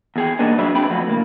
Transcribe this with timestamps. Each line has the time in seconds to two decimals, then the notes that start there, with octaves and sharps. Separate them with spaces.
0.16 E2 G#4 G5
0.39 B2 G3 A#3 B3 D4 D#4
0.58 F#2 F#3 D4 G#4 B4 E5
0.75 C4 D4 B4 G5 B5
0.90 D3 F3 F#3 A3 F#4 B4
1.07 A2 C#3 A#3